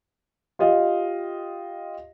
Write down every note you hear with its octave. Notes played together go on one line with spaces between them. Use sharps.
F4 G4 D#5 F5